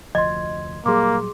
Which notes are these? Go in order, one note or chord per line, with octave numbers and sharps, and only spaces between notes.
F1 D2 F3 D#5 C6 G#6
A#2 F#3 G3 A#3 G#4 C6 D6